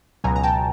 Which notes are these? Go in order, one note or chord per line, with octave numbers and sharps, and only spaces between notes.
C#2 B2 F#3 G#5 A#5
A#5
G5 A5